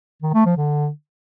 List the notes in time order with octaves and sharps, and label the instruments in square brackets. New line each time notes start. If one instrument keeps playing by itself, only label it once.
[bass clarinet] D#3
A3
F3
D3